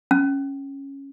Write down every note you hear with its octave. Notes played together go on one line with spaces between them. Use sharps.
C#4